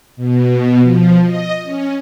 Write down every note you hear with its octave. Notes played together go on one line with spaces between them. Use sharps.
B2
F3
D#5
C#4